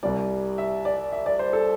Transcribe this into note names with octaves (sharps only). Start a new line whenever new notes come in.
C2 C3 G3 D5
E5
D5
E5
D5
C5
A4